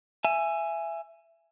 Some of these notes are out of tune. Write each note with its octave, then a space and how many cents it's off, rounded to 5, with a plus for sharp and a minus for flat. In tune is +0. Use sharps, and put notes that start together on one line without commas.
E5 +20 G#5 +0